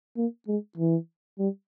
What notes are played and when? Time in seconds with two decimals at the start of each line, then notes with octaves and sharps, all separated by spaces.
0.17 A#3
0.48 G#3
0.77 E3
1.39 G3